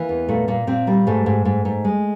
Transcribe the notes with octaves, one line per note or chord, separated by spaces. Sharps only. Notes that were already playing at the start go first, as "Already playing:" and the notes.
Already playing: E3 A#3
E2
A#2 A3
A#2 A#3
A#2 C4
G3 A#3
G#2 A3
G#2
G#2
G#2
G#3